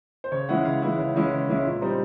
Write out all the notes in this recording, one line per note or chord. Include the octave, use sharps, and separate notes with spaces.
C5
C#3 C#5
E3 G#3 C#4 E4 F#5
C#3 F5
E3 G#3 C#4 E4
C#3
E3 G#3 C#4 E4
C#3
E3 G#3 C#4 E4
A#2
G3 C4 D#4